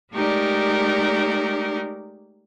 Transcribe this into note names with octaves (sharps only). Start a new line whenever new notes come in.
G#3 A3 D#4 G4 A#4 D5